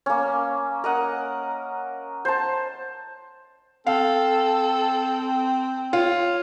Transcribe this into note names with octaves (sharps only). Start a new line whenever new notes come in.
A#3 C#4
A#4 D#5 F#5
C5 A5
C4 A4 F5
F4 C#5